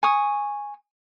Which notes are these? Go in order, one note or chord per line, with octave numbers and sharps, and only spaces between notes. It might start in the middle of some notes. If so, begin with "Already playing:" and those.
G#5 C#6 D#6